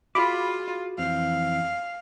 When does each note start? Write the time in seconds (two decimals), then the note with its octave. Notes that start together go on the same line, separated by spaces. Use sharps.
0.15 F4 F#4 G#4 B5 D6
0.98 F2 E3 C4 F5